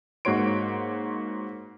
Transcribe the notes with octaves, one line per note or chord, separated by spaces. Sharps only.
G#2 A#3 F#4 C#5 C6 D7